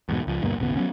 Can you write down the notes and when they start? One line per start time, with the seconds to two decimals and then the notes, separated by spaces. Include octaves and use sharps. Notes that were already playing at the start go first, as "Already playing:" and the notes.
0.09 E2 G#2 B2
0.27 C#2 F3
0.42 D2 G2 B2 A#3
0.58 D#1 G#1 C#3 B3
0.76 F#3 A#3 B3 C#4